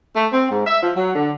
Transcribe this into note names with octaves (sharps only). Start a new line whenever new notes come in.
A3
C4
G#2
E5
F3
F#3
D3